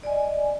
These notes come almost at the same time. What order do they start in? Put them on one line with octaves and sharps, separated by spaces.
D5 G#5 D#5